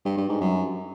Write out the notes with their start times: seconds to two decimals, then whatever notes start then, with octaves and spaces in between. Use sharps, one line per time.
0.05 G2
0.17 G2
0.29 G#2
0.41 F#2